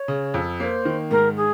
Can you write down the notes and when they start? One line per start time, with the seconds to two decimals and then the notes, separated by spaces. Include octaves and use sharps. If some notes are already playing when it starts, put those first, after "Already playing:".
Already playing: C#5
0.08 C#3
0.34 F2
0.60 A#3 C5 C#5
0.85 D#3
1.11 G#2 A#4
1.36 G#4